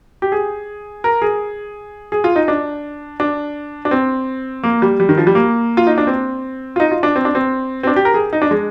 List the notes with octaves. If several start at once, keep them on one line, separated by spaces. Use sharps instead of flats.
G4
G#4
A#4
G#4
G#4
F4
D#4
D4
D4
D4
C4
A#3
G3
G3
D#3
F3
G3
A#3
F4
D#4
D4
C4
F4
D#4
F4
D4
C4
D4
C4
C4
D4
G4
A#4
G#4
D#4
D4
G#3